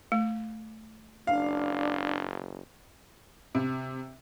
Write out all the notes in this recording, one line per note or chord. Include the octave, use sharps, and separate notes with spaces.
A3
F#1 D4 F5
C3